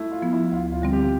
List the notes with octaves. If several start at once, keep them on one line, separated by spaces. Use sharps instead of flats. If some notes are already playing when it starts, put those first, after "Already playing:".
Already playing: A3 E4
F4
F3 B3
E4
D2 F4
F4
D3 G3 C4
G4